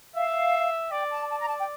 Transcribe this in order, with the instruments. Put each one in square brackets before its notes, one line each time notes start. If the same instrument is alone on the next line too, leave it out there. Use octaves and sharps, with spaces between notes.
[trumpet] E5 [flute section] F5
[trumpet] D5 [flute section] G5
[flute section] A5
A5
A#5
A5
G5